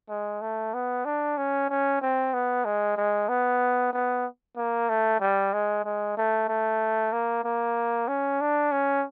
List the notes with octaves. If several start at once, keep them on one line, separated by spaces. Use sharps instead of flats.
G#3
A3
B3
D4
C#4
C#4
C4
B3
G#3
G#3
B3
B3
A#3
A3
G3
G#3
G#3
A3
A3
A#3
A#3
C#4
D4
C#4